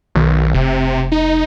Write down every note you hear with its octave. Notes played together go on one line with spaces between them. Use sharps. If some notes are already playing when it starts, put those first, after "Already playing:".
B1 D#3
F1 C3
D#4